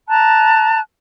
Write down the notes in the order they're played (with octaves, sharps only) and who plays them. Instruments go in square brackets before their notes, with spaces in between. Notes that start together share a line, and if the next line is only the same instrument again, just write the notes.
[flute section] A5 A#5 F#6